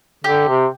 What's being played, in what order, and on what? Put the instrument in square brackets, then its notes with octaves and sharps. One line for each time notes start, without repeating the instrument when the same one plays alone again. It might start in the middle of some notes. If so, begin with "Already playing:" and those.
[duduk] D3 [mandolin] G4
[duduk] C3